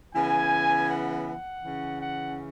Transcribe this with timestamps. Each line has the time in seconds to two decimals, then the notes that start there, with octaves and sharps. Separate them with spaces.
0.14 C#3 E3 B3 G#5
0.88 F#5
1.26 F#5
1.62 C#3 E3 C#4
2.00 F#5